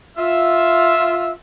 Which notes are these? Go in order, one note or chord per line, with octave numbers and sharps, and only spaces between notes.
F4 E5